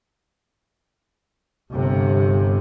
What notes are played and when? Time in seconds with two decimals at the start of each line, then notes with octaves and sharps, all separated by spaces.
1.73 G1 C3